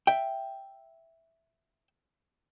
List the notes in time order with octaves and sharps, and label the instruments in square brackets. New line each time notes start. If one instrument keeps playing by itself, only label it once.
[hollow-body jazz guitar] E5 G5